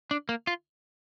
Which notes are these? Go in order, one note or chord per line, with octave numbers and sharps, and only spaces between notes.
D4
A#3
F4